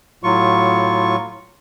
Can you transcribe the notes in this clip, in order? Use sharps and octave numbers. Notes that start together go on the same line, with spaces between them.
A2 F#3 F4 C#6